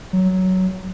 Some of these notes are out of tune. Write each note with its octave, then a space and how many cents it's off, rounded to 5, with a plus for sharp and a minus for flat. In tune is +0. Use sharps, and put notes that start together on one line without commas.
F#3 +10